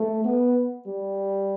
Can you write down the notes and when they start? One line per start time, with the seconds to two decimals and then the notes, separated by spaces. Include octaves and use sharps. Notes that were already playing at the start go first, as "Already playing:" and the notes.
Already playing: A3
0.24 B3
0.87 G3